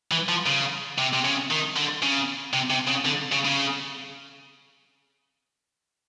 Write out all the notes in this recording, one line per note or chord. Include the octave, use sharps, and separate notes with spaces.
E3
F3
C#3
C3
C3
C#3
D#3
D3
C#3
C3
C3
C#3
D3
C#3
C#3